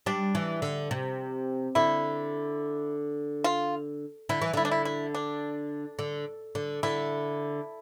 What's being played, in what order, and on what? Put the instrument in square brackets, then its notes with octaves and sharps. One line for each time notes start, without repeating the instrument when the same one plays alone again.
[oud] G3 [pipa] D4
[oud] E3
D3
C3
[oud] D3 [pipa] E4
[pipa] F4
[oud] D3 [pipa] E4
[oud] E3
[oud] D3 [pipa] E4
[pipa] D4
E4
E4
D4
[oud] D3
D3
[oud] D3 [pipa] E4